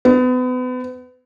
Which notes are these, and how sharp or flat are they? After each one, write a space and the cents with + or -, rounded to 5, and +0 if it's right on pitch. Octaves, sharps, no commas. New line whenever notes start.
B3 +35